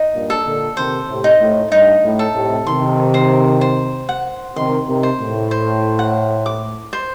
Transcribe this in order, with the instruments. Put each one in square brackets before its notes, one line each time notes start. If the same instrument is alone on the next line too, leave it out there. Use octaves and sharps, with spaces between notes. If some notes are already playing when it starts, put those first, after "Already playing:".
Already playing: [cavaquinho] D#4
[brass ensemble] G2 A#2
[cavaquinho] A4
[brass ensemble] A#2 D3
[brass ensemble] C3 D#3 [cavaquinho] C5
[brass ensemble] A2 C3
[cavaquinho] D#4
[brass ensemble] A2
[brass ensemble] G2 [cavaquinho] D#4
[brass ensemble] A2
[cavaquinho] A4
[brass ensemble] A2 C3
[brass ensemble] C3 D#3 [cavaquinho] C6
[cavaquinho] C5
C5
F#5
[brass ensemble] C3 D#3 [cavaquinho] C6
[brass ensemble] C3 D#3
[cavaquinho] C5
[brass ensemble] A2
[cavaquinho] C5
F#5
D6
C5